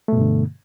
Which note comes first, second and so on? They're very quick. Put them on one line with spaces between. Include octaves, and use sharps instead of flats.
A3 B2 G2 D3